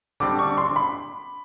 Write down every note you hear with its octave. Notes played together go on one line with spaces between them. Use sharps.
D3 G3 C4 D6
C#6
C6
B5